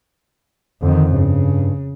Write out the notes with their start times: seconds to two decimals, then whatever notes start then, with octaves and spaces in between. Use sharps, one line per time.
0.82 F2 D3 D#3
1.13 G2 C#3